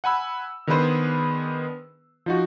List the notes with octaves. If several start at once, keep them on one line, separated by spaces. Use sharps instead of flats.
F#5 G#5 B5 E6
D#3 B3 D4 G#4 B4 C5
F3 D#4 F#4